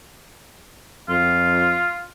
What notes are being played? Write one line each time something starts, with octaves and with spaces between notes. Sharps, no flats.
F2 F4